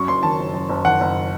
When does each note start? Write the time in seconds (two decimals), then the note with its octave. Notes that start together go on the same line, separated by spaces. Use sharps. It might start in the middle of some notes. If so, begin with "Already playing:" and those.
Already playing: F#2 C#6
0.08 F#1 C6
0.23 D#3 A5
0.39 F#1
0.54 F#2
0.69 F#1
0.85 D#3 F#5
1.01 F#1